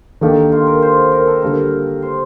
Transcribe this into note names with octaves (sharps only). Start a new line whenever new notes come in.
D#3 A#3 D4 G4 A4
F4
A#4
C5
A#4
A4
D3 G3 A#3 D4 A#4
C5